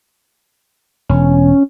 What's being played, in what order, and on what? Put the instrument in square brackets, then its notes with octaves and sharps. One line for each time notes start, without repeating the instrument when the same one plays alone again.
[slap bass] E1 [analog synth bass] C#4